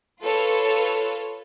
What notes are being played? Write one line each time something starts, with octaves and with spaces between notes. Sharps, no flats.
F4 A4 B4 C#5